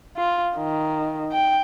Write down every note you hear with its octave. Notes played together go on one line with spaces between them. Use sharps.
F4
D#3
G5